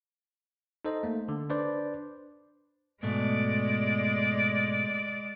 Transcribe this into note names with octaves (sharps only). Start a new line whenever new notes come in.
D#4 A4 C5 D#5
A3 A#3
D3
D4 B4 C5 D5
G#2 B2 G#3 A3 D5